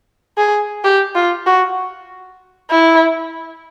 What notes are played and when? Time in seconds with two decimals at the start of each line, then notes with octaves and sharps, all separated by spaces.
0.38 G#4
0.84 G4
1.15 F4
1.46 F#4
2.71 E4